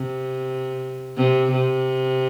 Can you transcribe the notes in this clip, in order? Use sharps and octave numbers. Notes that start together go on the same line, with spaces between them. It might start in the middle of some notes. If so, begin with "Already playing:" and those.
Already playing: C3
C3
C3